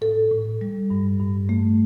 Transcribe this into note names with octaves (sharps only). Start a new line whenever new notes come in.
A2 A4
A2
G3
G2
G2
A3